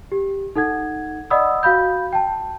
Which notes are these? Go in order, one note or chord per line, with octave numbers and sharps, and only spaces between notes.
G4
D#4 A4 F#5 G#6
D5 D#5 F#5 B5 D#6 E6
F#4 F5 B5 G6
G5 A5